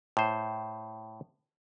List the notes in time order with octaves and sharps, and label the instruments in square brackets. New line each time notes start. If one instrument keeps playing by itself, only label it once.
[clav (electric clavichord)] A2 C5